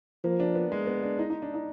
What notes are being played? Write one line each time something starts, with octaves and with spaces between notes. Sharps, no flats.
F3 A#3
D4
B3
G#3
B3
D4
D#4
D#4
D4
D#4